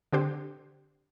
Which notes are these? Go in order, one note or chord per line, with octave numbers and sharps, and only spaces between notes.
D3 C4 D4 G4 C5